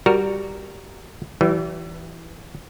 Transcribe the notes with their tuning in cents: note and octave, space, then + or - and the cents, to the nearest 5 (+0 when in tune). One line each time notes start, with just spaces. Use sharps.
G3 +0 F#4 +0 A#4 +0
E3 +0 G3 -45